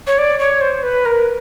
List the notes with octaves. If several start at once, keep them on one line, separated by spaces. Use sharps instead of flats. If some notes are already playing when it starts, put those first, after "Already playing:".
C#5
D5
C#5
C5
B4
A#4